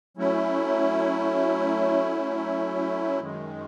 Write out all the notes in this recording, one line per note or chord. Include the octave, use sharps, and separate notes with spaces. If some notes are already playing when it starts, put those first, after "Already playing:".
F#3 A3 C#4 E4
F#2 D#3 G#3